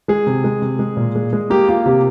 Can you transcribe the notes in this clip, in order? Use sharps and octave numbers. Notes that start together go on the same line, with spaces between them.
G#3 G#4
C3
G#3
C3
G#3
A#2
G#3
G#3
A#3 G4
A#3 F4
C3 G4